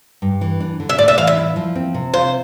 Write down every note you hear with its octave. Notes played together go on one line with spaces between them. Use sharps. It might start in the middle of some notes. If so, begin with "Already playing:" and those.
G2
E3
D4
D3
E5
A2 D5
E5
E3 F5
E5
E4
F3
C4
C3
F4 C5